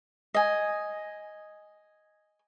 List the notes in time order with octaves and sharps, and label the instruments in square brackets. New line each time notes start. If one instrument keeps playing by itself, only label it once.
[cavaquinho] D#5 G#5